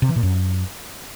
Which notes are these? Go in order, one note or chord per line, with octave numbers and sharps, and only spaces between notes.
C3
E3
A#2
F#2